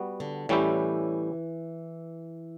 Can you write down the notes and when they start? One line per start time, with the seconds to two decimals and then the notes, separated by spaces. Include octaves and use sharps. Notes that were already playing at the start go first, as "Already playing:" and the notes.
Already playing: G3 B3 F#4
0.20 D3
0.49 A2 E3 G3 C#4 E4 G4